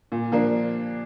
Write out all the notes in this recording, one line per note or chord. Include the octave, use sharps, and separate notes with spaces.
A#2
F3 A#3 D4